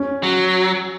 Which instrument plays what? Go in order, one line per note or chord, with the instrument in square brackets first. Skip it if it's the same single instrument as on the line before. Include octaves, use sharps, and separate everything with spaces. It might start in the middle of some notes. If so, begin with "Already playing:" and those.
Already playing: [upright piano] C#4
[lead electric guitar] F#3